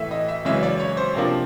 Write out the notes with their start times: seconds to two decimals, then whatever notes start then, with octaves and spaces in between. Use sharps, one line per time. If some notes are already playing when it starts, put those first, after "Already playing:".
Already playing: A2 E3 A3 E5
0.11 D#5
0.28 E5
0.45 F#2 C#3 E3 G#3 C#4 E5
0.63 D5
0.80 C#5
0.97 C5
1.14 C3 F3 A#3 D4